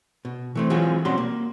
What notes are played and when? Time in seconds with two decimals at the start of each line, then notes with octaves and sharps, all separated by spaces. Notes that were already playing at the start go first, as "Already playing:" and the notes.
0.25 B2
0.55 E3 A3 C4
0.70 E3 F#3 G#3 C4 F4 G#4
1.05 B1 G3 C4 C#4 F#4 C6
1.18 A#3